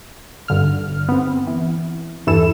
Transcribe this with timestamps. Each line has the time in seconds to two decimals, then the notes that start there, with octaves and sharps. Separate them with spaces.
0.48 G#1 G2 D3 F6
1.09 B3 C4
1.47 E3
2.27 E2 G2 E3 A4 E7